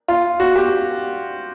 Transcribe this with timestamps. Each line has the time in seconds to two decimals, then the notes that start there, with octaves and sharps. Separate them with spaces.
0.08 F4
0.40 F#4
0.56 G4